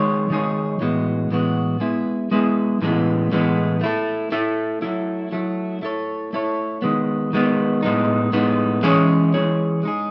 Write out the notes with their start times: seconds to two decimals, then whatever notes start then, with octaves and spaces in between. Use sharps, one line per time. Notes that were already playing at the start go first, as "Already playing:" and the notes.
Already playing: D#3 G#3 D#4 G#4 C#5
0.30 D#3 G#3 D#4 G#4 C#5
0.80 A2 E3 G#3 B3 F#4
1.30 A2 E3 G#3 B3 F#4
1.80 G#3 B3 E4 G#4
2.31 G#3 B3 E4 G#4
2.82 A2 E3 G#3 B3
3.32 A2 E3 G#3 B3
3.81 A3 E4 A4
4.32 A3 E4 A4
4.82 F#3 A3 E4
5.32 F#3 A3 E4
5.82 A3 E4 A4 C#5
6.33 A3 E4 A4 C#5
6.82 D#3 G#3 B3
7.33 D#3 G#3 B3
7.83 A2 G#3 B3 D#4
8.33 A2 G#3 B3 D#4
8.83 E3 G#3 C#4 G#4 C#5
9.34 E3 G#3 C#4 G#4 C#5
9.83 G#3 D#4 G#4